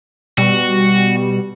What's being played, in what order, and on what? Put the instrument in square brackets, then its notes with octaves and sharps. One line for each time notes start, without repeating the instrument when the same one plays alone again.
[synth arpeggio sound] B2 G3 [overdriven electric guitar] F#4